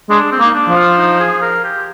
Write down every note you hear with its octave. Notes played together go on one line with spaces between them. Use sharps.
G#3 D4
C4
A#3 D#4
D4
F3
F4
D#4
G#4
A#4
G4